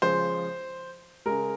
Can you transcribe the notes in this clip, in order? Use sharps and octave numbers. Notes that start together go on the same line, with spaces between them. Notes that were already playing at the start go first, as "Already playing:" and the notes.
C#3 F3 G#3 C5
C#3 G#3 A#4